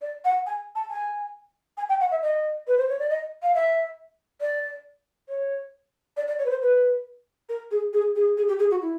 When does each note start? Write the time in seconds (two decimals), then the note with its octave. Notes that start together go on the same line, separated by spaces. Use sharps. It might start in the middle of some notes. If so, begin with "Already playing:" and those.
0.02 D5
0.25 F#5
0.46 G#5
0.75 A5
0.90 G#5
1.77 G#5
1.89 G5
2.00 F#5
2.11 E5
2.22 D#5
2.68 B4
2.77 C5
2.89 C#5
2.99 D5
3.10 D#5
3.43 F5
3.54 E5
4.41 D5
5.29 C#5
6.17 D5
6.28 D5
6.39 C#5
6.46 B4
6.50 C5
6.62 B4
7.49 A#4
7.71 G#4
7.93 G#4
8.16 G#4
8.37 G#4
8.48 G4
8.59 G#4
8.70 F#4
8.81 E4